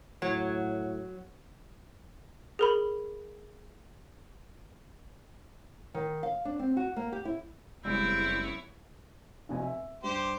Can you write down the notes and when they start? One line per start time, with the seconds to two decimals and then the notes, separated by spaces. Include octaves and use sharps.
0.22 A2 F#3
2.59 G#4 A#4 B5
5.94 D#3
6.23 F5
6.45 D4
6.59 C4
6.77 F#4
6.96 A#3
7.12 G4
7.25 E4
7.85 F#1 G3 G#3 B3 C4 E4 C#5
9.49 F1 B2 G#5
9.62 E5
10.04 G2 G4 C5